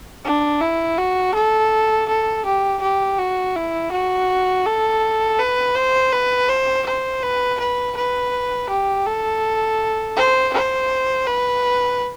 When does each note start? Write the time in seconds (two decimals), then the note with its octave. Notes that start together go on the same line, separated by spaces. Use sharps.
0.24 D4
0.61 E4
0.97 F#4
1.34 A4
2.08 A4
2.45 G4
2.81 G4
3.18 F#4
3.55 E4
3.91 F#4
4.66 A4
5.39 B4
5.75 C5
6.12 B4
6.49 C5
6.86 C5
7.22 B4
7.59 B4
7.96 B4
8.69 G4
9.06 A4
10.17 C5
10.53 C5
11.27 B4